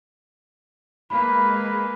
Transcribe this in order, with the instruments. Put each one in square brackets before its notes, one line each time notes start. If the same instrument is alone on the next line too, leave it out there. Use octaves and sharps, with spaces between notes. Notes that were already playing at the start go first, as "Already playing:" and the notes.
[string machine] G#3 [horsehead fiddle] A#3 B4 [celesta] B5